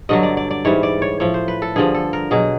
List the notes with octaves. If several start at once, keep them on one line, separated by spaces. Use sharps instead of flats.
G2 D3 F#3 D#5
D5
D5
D5
G#2 E3 G3 C#5
D5
C#5
A2 F3 C#5
C5
B4
A4
G2 D3 F3 G#4
A4
A#4
B2 F#3 G#4